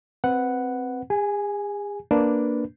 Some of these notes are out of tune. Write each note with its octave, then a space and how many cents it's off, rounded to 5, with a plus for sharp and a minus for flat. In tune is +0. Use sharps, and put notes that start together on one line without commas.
C4 +0 B4 +5 F#5 +0
G#4 -40 G#5 +0
A#3 +0 D4 +0 B4 +0